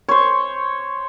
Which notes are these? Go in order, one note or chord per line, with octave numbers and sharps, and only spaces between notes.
C5 C#5